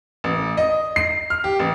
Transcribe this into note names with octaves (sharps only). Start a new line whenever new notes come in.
A1
D#5
C7
F6
G4
A1